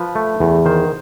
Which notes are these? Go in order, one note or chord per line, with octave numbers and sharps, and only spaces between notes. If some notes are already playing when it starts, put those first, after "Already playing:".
Already playing: F3 B4
A3
E2
D#3 C5